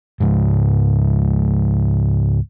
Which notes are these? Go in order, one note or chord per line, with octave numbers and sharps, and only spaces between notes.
C#2 G#2